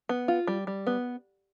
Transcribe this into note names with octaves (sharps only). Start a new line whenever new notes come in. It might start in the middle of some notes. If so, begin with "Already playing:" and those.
B3
F4
G3
G3
B3